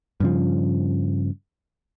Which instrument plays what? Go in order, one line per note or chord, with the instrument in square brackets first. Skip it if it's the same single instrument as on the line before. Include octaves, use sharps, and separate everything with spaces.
[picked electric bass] G2 C#3 F3